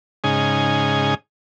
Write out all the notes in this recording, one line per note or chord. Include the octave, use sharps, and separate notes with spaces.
G#2 C#3 D#4 G#5